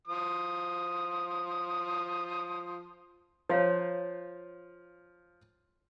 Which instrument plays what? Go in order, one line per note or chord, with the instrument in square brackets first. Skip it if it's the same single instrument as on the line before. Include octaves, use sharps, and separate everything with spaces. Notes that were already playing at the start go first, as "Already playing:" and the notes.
[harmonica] F3 D#6
[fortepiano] F3 F4 [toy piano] C#5 F5 A#5